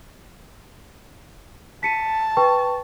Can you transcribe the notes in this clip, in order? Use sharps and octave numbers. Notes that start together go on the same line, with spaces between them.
A5 B6 C#7 D#7
B4 G5 C#6